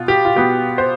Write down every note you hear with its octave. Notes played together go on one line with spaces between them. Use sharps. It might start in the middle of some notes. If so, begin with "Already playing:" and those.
Already playing: B2 B3 F4
G4
F4
B2 B3 G4
C5